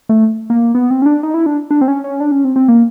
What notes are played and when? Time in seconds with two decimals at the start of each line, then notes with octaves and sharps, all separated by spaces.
0.09 A3
0.50 A#3
0.75 B3
0.90 C4
1.02 C#4
1.06 D4
1.23 D#4
1.34 E4
1.46 D4
1.71 D4
1.81 C4
1.88 C#4
2.04 C#4
2.20 D4
2.32 C#4
2.45 C4
2.56 C4
2.68 A#3